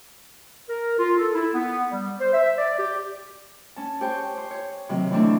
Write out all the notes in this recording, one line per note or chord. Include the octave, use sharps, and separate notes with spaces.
A#4
F4
A4
E4
B3
G3
C5
E5
D5
G4
C#4 A5
G4 C5 C#5 G5 C#6
C5
C#5
C3 D#3 F#3 C4
E2 E3 A3 C4 D4 C#6